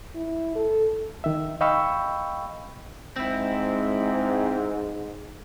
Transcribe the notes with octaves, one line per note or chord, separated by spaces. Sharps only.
E4
A4
D#3 E5
D#5 F5 G5 B5 C#6 E6
G#2 C4 E4